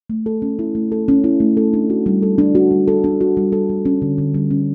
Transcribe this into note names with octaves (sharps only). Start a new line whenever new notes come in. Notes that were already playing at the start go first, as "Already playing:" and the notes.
A3
A4
C#4
E4
A3
A4
C#4
E4
A3
A4
D4
F#4
G3
A4
D4
F#4
G3
A4
D4
F#4
G3
A4
G3
C#4
D3
D3
G3
C#4